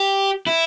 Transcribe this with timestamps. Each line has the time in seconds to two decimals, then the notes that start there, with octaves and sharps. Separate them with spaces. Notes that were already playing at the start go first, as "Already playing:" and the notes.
Already playing: G4
0.47 E4